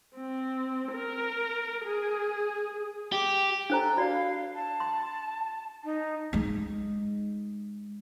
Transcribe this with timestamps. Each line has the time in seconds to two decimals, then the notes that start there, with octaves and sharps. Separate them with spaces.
0.15 C4
0.92 A#4
1.84 G#4
3.12 G4
3.70 D4 A4 C5 A#5
3.97 F#4 D5 F5
4.55 A5
4.80 C6
5.84 D#4
6.33 G#3 D#4